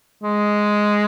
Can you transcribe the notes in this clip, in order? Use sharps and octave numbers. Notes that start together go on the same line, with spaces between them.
G#3